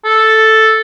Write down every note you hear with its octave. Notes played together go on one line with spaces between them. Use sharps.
A4